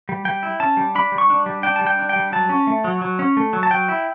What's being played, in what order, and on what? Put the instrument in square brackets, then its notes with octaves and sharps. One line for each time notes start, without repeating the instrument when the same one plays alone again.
[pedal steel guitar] G3
G3 G5
E4
C#4 A5
G3
D4 B5
G3
C#6
D4
G3
D4 G5
A5
G3
G5
D4
G5
G3
F#3 A5
C#4
A3
F#3
F#3
C#4
A3
F#3
A5
F#3 G5
E4